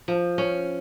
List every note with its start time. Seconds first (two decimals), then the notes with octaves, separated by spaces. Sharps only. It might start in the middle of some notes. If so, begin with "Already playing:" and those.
0.08 F3
0.38 C#4